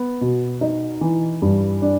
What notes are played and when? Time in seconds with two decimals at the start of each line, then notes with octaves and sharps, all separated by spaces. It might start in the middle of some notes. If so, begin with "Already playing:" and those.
Already playing: B3
0.21 B2
0.61 D#4
1.01 E3
1.42 G2
1.82 D4